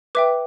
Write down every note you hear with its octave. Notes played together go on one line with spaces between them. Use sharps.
B4 E5 G5 D6